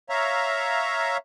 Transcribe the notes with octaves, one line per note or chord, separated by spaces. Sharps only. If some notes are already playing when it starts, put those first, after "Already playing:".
C#5 E5 F5 A#5